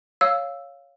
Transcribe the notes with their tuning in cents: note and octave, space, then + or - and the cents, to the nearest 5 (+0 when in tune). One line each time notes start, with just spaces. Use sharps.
C#5 +0 F5 +0 E6 +0